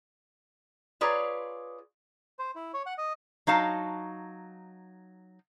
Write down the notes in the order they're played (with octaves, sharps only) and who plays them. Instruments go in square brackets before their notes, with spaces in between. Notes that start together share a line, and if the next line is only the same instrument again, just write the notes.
[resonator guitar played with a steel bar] F4 G#4 B4 C#5 D5 A#5
[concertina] C5
E4
C#5
F#5
D#5
[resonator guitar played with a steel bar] F#3 D#4 F5 A5